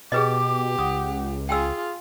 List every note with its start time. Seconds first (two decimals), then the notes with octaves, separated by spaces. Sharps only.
0.12 B2 G4 G#4 B4 D#5 D6
0.79 C#2 F#5 D#6
1.49 F4 G#4 G5 G#5 E6